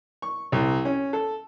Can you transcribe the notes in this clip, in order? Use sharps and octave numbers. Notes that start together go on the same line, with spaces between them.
C#6
C2
C#4
A4